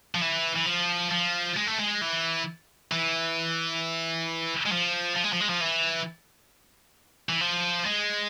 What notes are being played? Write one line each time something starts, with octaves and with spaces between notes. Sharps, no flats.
F3
E3
E3
F3
F3
G#3
A3
G#3
E3
E3
G#3
F3
F3
G#3
F3
G#3
F3
E3
E3
F3
G#3